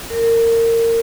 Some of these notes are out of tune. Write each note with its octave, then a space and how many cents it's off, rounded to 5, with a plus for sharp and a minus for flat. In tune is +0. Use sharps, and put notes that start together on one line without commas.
A#4 -25